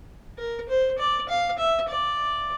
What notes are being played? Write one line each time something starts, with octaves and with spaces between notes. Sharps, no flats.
A#4
C5
D5
F5
E5
D5